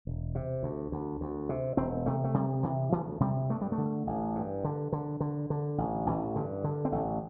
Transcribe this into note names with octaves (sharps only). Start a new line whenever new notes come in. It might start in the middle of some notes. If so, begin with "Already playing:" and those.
E1
C3
D2
D2
D2
C3
E1 C4
C3 A3
A3
C3 G3
C3 E3
D2 E3
C3 G3
G2 A3
G3
A3
D3
A1
G2
D3
D3
D3
D3
A1
A1 E3
G2 D3
D3
C4
A1 A3